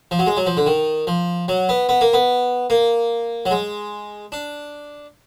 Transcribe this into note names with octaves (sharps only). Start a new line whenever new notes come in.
F3
F#3
G#3
F#3
F3
D3
D#3
F3
F#3
B3
B3
A#3
B3
A#3
F#3
G#3
D4